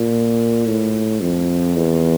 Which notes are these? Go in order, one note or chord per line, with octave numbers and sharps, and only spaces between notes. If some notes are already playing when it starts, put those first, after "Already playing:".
Already playing: A#2
A2
F2
E2